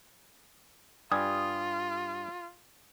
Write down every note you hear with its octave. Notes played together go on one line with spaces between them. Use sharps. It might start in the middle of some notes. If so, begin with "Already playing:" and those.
G2 G3 F4 G#5 D#6